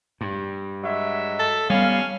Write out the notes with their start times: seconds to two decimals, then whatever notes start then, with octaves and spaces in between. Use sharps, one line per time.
0.21 G2
0.84 F#3 G#3 E5
1.39 A4
1.70 G3 B3 C#4 F5